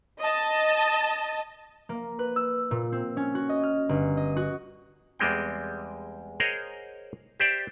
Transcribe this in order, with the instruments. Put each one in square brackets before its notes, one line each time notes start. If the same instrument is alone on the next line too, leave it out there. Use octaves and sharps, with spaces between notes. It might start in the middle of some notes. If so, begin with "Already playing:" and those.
[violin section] D#5 A5
[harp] A#3
B4
E6
A#2
C4
C#4
F#4
D#5
F6
G1
D#5
F#4
[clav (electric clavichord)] E2 G3 G#3 C4 G5
G#4 A#4 C5 C#5 D#5 F#5
G4 C5 D5 E5